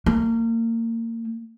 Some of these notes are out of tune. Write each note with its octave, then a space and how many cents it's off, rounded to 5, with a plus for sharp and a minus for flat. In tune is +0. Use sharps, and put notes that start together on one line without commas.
A#3 -30